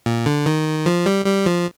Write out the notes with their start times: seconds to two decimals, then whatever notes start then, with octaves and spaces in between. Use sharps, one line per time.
0.06 A#2
0.26 D3
0.46 D#3
0.86 F3
1.06 G3
1.26 G3
1.46 F3